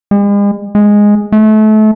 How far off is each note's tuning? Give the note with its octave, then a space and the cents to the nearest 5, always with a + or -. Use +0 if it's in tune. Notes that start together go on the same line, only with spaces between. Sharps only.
G#3 -45
G#3 -5
A3 -30